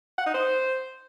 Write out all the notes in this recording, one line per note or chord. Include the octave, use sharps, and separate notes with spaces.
F#5
D#4
C5